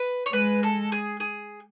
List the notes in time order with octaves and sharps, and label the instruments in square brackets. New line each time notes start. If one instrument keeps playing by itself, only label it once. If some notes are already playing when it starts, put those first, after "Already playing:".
Already playing: [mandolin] B4
C#5
[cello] G#3 [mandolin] B4
[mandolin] A4
G#4
G#4